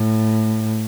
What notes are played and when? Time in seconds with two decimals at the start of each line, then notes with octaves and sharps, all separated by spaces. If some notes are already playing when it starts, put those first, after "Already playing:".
Already playing: A2